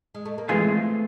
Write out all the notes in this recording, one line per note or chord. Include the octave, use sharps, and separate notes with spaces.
G#3
A3
A#3
E3 G#3 A3 B3 C4 F4 G#4